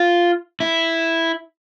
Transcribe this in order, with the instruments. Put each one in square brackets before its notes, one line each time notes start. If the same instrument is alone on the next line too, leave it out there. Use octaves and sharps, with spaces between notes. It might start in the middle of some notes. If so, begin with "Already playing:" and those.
Already playing: [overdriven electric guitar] F4
E4